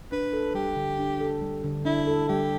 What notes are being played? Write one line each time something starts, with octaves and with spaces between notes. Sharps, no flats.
D4 B4
A4
G3 G4
D3
D4
A4
G3
D3
D4 E4
A4
G3 G4